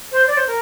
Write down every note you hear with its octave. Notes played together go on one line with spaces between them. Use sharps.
C5
D5
C5
A#4